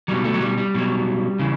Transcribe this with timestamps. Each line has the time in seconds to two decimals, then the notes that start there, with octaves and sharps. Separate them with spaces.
0.08 B2 F#3 G3
0.24 A3
0.34 F#3
0.41 G3
0.58 G3
0.75 B2 F#3
1.39 C#3 E3